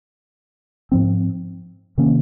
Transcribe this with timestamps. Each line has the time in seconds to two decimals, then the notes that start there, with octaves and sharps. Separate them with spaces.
0.92 G#2 F3 C4
1.98 C3 D#3 A#3 C#4